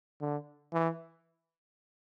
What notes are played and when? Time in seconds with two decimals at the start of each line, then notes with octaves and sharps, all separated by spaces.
0.21 D3
0.73 E3